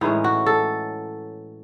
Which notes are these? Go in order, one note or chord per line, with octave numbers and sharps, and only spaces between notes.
A2 E3 G#3 C#4 D#4
F#4
A4